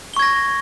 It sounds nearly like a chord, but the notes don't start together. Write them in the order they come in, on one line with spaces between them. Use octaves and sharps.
G7 C#6 G#6 A#6